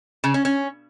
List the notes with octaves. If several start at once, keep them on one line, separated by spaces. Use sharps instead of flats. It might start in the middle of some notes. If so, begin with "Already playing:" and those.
C#3
C#4
C#4